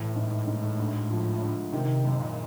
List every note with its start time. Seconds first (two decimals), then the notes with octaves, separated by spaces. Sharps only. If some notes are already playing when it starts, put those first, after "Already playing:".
Already playing: A2 E3
0.16 G#2
0.47 G#2
0.79 D2
1.10 F3
1.42 D3
1.73 C3 D#3
2.04 F#1
2.20 A#2